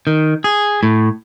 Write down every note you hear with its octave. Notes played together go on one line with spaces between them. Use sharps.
D#3
G#4
A2